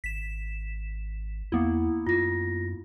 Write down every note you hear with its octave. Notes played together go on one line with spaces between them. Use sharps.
G#1 B6 E7
E2 A#3 B3 E4
F#2 F4 A#6